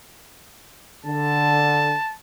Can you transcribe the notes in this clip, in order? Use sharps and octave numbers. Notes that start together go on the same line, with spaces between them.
D3 A5